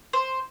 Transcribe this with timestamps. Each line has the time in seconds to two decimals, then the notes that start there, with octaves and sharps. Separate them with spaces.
0.13 C5